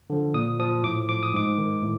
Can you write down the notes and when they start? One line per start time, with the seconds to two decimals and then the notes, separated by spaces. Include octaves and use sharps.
0.10 D3 F3
0.34 A#2 D#6
0.59 F3 D#6
0.83 A2 D6
1.09 F3 D6
1.23 D#6
1.34 G#2 D6
1.58 D#3
1.83 A2